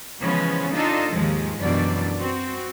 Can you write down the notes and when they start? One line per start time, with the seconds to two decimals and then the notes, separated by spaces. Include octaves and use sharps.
0.20 C#3 E3 F3 G#3 B3 C#4
0.73 D4 D#4 F4 A4 D#5
1.11 D#2 G#2 F3 G#3
1.58 F#2 B2 E3 G3 D4 D5
2.18 C4 F#4